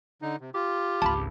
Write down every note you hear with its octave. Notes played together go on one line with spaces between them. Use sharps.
D3 D#4
C3
F4 G4
G#1 C#2 A5 B5